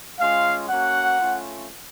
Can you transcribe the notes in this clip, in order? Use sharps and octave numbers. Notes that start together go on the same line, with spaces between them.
G#3 C#4 F4 F5
A#3 C#4 F#4 F#5
A3 C#4 F4